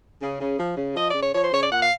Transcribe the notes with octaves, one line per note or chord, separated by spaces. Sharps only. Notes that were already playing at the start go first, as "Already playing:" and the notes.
C#3
C#3
F3
C#3
F3 D#5
D5
C#3
C#5
F3 C#5
C5
C#3 C#5
D5
A#2 F#5
F5